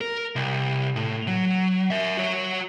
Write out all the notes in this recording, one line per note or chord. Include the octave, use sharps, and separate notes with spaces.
A#4
C2
A2
F#3
A#4 E5
F#4 C#5